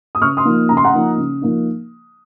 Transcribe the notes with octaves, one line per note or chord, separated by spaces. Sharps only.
D#6
C#3 C#6 F6
C6 D#6
F3 A#3 D#4
C#3 A#5
C6
F#5 A#5
F3 A#3 D#4
C#3
F3 A#3 D#4